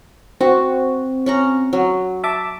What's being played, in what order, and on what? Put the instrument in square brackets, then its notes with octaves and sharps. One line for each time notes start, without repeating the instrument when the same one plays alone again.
[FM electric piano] C4 [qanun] F#4
[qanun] C#4 F#5 A#5
F#3
[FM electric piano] E5 A5 D6